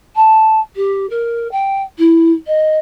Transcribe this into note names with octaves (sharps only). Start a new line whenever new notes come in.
A5
G4
A#4
G5
E4
D#5